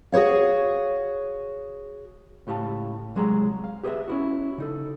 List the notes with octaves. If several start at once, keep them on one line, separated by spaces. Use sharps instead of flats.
F#4 G#4 C5 C#5 F5
C#2 A2 G4 F5 A5
C2 F#3 G#3 G#4 E5 A#5
F5
G4 G#4 B4 C#5 D#5 E5
C#4 E4 F#4
C#3 D#4 A4